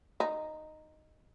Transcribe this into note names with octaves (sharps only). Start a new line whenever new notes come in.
D#4